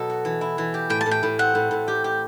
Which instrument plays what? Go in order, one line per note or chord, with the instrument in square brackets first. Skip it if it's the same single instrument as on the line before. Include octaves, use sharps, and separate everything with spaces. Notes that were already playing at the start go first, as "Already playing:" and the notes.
Already playing: [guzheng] B2 F#3 A4
F#4
E3
E4
E3
G4
[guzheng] A2 [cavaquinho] G5
[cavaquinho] A5
[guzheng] A2
[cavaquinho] G5
[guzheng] A2
[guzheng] C4 [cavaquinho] F#5
[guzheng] A2
A2
G4
G4